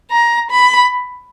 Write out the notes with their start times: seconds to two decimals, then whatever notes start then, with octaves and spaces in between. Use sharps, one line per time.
0.11 A#5
0.50 B5